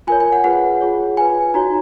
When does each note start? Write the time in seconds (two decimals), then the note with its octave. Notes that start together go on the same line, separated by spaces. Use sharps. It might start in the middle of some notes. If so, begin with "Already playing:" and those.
0.07 F4 A#4 C#5 G#5
0.20 G#5
0.32 F#5
0.44 F4 G#4 B4 F#5
0.81 F4 G#4 C#5
1.17 F4 B4 G#5
1.54 D#4 F#4 C#5 A#5